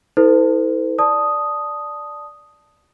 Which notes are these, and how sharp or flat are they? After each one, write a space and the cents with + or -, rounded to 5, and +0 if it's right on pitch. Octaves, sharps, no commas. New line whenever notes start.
E4 -35 A4 +25 C5 -40
D5 +0 A5 +0 D#6 +0